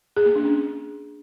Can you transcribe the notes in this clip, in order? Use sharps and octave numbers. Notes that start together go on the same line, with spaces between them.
G#4
A#3
D4
C#4